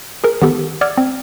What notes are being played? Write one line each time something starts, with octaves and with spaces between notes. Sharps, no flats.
G#4 A#4
D#3 B3 G4 A4
D5 F#5 D6 E6 F6 G#6
C4